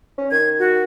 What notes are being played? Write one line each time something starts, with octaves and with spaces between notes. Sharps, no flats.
C#4
D#3 G#6
F#4